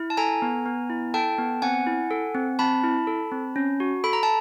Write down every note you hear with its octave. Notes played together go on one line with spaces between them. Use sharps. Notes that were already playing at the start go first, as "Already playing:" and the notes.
Already playing: E4
A5
A4 G#5 A#5
B3
B3
E4
A4 G5 A5
B3
C4 F#5 G#5
E4
A4
C4
C4 A5 B5
E4
A4
C4
C#4
F#4
A4 B5
A#5
A5